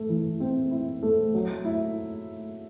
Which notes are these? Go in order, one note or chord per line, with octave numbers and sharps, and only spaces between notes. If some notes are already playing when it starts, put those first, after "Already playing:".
Already playing: A3
E3
C4
E4
A3
F#3
E4